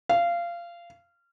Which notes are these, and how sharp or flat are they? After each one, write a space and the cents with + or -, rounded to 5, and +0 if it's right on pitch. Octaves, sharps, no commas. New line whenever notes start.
F5 -20